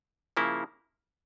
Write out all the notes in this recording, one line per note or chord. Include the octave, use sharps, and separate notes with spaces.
C#3 F3 A#3 E4